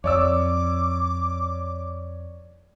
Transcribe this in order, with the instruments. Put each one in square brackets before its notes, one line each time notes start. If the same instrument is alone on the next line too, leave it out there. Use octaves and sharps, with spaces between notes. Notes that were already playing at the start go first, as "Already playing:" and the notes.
[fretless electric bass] F2 [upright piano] C#5 D5 E6 [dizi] D6